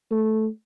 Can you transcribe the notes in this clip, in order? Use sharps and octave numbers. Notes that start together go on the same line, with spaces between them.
A3